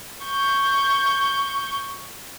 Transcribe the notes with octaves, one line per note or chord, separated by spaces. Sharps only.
C#6 G6